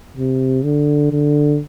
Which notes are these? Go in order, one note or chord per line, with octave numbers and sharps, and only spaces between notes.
C3
D3
D3